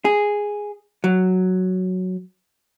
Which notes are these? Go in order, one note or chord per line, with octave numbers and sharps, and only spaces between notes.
G#4
F#3